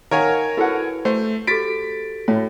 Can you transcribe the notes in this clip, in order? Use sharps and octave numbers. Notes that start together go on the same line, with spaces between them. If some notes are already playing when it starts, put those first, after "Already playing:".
D#3 A#4 C#5 F5 F#5 G#5
E4 F#4 A4 B4 F#5
A3 C5
F#4 G4 A4 A6 B6 D7
A2 F#4 C#5